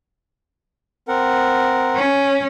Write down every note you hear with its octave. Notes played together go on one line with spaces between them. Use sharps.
C4 A#4 F#5
C#4